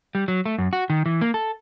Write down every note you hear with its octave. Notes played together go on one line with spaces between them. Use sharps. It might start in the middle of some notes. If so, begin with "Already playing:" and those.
G3
F#3
A3
F#2
F#4
D#3
E3
A#3
A4